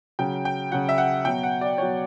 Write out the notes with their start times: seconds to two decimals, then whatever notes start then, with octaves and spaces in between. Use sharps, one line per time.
0.19 C#3 F#3 G5
0.45 G5
0.72 C#3 F#3 F#5
0.89 E5
0.98 F#5
1.25 B2 F#3 G5
1.43 F#5
1.61 D5
1.78 B2 F#3 C#5